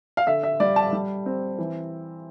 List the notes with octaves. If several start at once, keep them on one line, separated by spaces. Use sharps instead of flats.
F5
D3 E5
E5
G3 D5
A5
G3
C4
E3